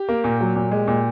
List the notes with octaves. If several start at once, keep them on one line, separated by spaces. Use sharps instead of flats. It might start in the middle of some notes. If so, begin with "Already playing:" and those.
Already playing: G4
A#3
A#2
F#3
A#2
G#3
A#2